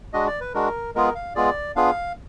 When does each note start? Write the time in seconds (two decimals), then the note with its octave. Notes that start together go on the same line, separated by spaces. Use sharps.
0.13 G#3 D4 F#4 D#5
0.28 D5
0.40 B4
0.54 G#3 D4 F#4 A#4
0.95 G#3 B3 F4 G#4 A#4
1.15 F5
1.35 G#3 B3 F4 G#4 D5
1.76 B3 D4 F4 G#4 F5